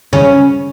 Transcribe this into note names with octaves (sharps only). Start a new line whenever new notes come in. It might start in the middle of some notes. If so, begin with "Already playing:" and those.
C#3 C#4